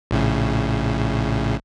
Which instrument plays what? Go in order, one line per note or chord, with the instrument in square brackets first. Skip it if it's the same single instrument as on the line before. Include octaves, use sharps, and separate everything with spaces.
[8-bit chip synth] A#1 A2 C#3